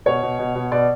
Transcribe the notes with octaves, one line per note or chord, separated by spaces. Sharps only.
B2 C#5
B2
B2
B2
B2 D5